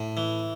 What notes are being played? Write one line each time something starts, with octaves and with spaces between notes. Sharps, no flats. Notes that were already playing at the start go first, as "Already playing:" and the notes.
Already playing: A2
E3